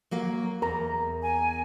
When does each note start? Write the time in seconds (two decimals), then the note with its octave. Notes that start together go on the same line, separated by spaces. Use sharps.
0.11 F#3 A#3 F5
0.62 E2 A#4 A#5
1.22 G#5